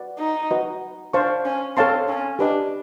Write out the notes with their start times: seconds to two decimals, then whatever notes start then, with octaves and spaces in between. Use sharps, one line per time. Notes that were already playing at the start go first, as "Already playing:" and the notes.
Already playing: F#4 B4 D5 F#5
0.19 D#4
0.51 F#4 B4 D#5
1.13 D4 C5 F5 A5 C#6
1.45 C#4
1.77 C4 A4 C#5 F5 A5 C6
2.08 C#4
2.39 D4 G4 B4 D#5